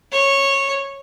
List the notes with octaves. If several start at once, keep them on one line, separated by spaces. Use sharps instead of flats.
C#5